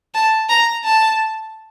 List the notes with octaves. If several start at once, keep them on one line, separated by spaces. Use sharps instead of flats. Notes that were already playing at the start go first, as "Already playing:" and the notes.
A5
A#5
A5